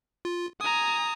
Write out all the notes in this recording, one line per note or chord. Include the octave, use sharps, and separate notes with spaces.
F4
G#5 A#5 D#6